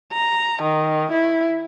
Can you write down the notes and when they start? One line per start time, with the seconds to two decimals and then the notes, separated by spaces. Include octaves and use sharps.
0.13 A#5
0.62 D#3
1.12 E4